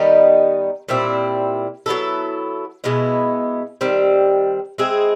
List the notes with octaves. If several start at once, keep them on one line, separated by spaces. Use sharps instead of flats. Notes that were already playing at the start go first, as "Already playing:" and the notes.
Already playing: D#3 G3 B3 D#4
A#2 G3 C4 E4
F#3 B3 E4 A4
B2 G#3 B3 E4
D#3 G3 C4
G#3 C4 E4 G#4